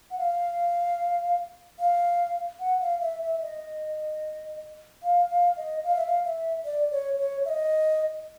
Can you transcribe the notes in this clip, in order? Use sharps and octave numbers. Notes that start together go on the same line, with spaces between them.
F#5
F5
F5
F#5
F5
E5
E5
D#5
F5
F5
D#5
F5
E5
F5
E5
D5
C#5
C#5
E5
D#5